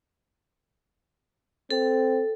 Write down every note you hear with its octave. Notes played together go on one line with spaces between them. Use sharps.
C4 A4